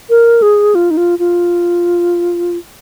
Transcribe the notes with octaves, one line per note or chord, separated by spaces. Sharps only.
A#4
G#4
F4
D#4
F4
F4